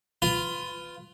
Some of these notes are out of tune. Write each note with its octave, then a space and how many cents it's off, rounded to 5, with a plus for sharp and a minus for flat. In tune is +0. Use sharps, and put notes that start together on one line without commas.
F4 +0 B4 +20